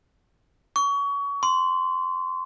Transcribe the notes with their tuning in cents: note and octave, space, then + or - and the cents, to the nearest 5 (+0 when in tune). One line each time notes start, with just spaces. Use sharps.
C#6 +30
C6 -15